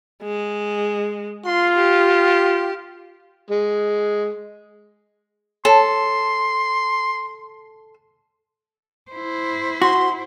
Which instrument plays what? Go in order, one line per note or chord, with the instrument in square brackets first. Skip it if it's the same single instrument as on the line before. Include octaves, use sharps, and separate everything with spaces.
[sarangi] G#3
[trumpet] F4 [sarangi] C6
[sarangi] G4
[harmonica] G#3
[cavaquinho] A4 [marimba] C#5 A5 [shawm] C6
[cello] E4 C5
[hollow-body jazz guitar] F#4 [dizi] C6